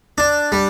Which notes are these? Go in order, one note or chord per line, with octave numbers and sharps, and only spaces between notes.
D4
G3